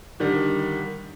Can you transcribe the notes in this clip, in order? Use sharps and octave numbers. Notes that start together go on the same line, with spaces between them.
D3 D#3 G3